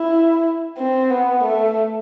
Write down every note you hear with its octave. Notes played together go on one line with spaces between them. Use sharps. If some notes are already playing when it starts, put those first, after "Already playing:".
Already playing: E4
C4
B3
A3